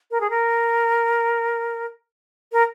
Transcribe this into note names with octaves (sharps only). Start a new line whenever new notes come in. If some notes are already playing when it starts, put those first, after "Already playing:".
A#4
G#4
A#4
A#4